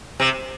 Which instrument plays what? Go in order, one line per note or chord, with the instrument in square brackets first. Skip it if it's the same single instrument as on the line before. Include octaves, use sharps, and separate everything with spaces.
[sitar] C3